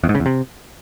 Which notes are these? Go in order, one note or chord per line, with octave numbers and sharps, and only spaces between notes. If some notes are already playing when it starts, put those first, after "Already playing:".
E2
G#2
C#3
E2
C3